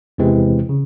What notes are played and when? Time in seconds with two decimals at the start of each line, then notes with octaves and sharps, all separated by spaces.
0.18 E2 C3 E3 G#3 C4
0.69 C#3